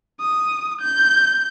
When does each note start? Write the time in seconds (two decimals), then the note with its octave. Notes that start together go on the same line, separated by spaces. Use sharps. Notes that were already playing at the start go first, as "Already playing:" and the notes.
0.20 D#6
0.81 G6